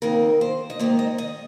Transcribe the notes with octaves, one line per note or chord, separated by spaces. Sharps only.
F2 D#3 A#3 A#4
C5
D#5
G#2 D#3 A#3 C5
D#5
D#5